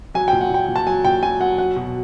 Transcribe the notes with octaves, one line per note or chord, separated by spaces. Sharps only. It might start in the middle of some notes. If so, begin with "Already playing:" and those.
F#3 G#5
A#2 G5
F#5
A#2 G5
A#2
A5
F#3 G#5
A#2 G5
F#3 G#5
F#3 F#5
F#3 F#5
B2